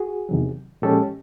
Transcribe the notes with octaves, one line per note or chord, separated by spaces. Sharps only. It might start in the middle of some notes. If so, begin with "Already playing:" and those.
Already playing: F#4 G#4
E2 C3 D#3 F#3
A#2 F3 G#3 C#4 G4 A4